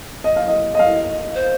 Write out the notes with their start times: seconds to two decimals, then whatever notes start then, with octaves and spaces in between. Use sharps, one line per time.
0.24 D#5
0.36 F5
0.48 D#5
0.75 D#5
0.79 F5
1.35 C5